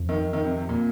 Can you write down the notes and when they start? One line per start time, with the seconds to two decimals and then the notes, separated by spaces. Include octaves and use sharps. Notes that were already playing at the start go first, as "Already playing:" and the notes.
Already playing: F2
0.09 D#3
0.33 D#3
0.44 C3
0.57 C3
0.69 A#2